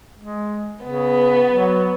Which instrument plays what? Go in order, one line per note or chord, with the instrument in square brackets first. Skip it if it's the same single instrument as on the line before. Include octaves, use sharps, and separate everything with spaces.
[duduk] G#3
[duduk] C#3 [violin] B3
[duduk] F#3